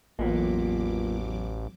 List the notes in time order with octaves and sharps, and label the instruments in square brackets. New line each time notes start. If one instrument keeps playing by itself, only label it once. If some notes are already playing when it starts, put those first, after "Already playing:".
[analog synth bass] A1 [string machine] E2 F#3 D6 [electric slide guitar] A#3 B3 [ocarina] F4